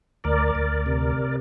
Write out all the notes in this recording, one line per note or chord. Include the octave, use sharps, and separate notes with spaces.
D2 A#4 D5
D2
C3